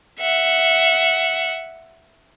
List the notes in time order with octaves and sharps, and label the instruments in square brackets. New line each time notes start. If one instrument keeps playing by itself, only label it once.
[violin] E5 F#5